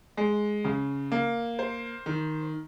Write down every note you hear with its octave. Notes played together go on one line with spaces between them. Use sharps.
G#3
C#3
A#3
C5
D#3